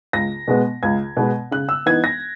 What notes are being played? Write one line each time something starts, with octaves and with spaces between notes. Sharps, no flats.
C#2 A#6
B2 G#3 B3
C#2 G#6
B2 G#3 B3
C#3 F#6
E6
E3 B3 D#4 G#6
A#6